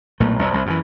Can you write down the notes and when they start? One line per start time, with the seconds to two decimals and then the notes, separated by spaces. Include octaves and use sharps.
0.20 B1 A#2 A3
0.39 B1 F2
0.53 C2
0.66 F#2 D3 E3